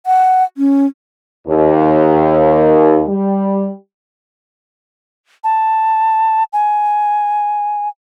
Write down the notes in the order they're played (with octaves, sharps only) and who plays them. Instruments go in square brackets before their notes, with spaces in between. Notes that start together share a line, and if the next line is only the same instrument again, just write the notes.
[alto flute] F#5
C#4
[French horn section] D#2
G3
[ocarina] A5
G#5